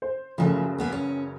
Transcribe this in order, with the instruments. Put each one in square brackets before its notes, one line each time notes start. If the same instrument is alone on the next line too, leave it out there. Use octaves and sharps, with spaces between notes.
[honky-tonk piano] C5
[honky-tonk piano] F#1 F#2 C#3 [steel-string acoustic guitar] F3 G3 A3
[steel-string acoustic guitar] A#3 B3 G#4
C#4